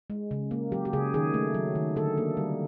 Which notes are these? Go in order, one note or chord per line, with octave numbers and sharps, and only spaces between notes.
G#3
C#3
A#3
F#3 G4
G4
C#3 G#4
D#3 G#4
A3
F#3
D#3
D3 A4
A#3
G3